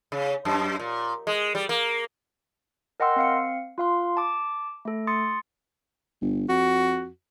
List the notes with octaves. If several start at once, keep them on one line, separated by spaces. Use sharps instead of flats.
C#3
F#2
A#2
G#3
G3
A#3
A#4 D#5 F#5 G5 C6 E6
C4 F5 C#7
F4 F5 C6
A5 D6
A3 A4
C6 D#6 A6 C#7
G1
F2 F#4